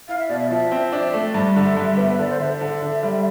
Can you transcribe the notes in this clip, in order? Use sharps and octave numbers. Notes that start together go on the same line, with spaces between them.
E4 F5
E5
B2 D5
E5
F3 E5
C4
D4 E5
D5
E5
A3
G2 E5
D3
G2
B3
D3 D5
C5
D3 E5
E5
D3
D3
G3